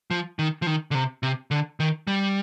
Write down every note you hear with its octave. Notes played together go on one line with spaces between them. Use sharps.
F3
D#3
F3
D#3
D3
C3
C3
D3
D#3
G3